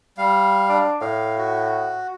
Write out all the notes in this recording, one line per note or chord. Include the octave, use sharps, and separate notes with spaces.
G3 F5
D4
A2 F5
F#4